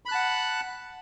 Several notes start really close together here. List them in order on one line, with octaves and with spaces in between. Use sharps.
B5 F#6 A5 F#5